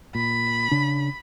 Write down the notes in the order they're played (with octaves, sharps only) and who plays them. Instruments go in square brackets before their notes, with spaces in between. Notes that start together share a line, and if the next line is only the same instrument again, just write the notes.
[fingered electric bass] A#2 [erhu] B5
[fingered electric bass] C#3 D4